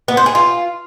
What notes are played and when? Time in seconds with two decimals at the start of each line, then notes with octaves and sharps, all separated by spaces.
0.08 B3
0.17 C5
0.26 G#4
0.35 F4